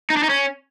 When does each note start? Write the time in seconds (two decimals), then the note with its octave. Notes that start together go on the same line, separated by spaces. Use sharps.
0.10 D#4
0.17 D4
0.23 D#4
0.29 C#4